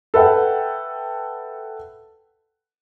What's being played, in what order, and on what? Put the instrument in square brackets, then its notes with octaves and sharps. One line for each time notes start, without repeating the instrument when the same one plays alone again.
[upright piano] A4 B4 E5 F#5 G5